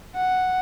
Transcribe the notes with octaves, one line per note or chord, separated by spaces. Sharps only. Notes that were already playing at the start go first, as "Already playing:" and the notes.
F#5